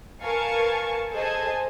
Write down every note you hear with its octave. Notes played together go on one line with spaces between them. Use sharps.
A#4 B4 F5 G#5 A5 C#6
G#4 A4 C5 D#5 G#5 A5